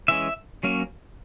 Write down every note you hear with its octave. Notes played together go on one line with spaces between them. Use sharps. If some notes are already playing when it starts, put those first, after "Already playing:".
E3 G#3 C#4 E5
F#3 A#3 C#4